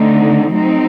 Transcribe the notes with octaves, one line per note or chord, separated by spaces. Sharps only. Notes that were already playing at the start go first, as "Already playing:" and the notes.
Already playing: D3 A3 C4 D#4
F#3 A3 C4 D#4